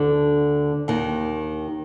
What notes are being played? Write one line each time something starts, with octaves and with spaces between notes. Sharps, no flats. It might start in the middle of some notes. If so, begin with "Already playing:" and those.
Already playing: D2 D3
D#2 D#3